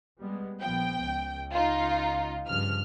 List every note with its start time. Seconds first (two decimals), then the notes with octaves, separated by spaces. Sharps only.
0.21 G3 G#3 B3
0.60 A#1 F3 B3 G5
1.01 C#2
1.52 D#4 F4
2.48 G2 C#3 F3 F6